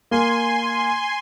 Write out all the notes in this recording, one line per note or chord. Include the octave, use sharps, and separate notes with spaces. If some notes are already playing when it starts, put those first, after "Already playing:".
A#3 G#5 C6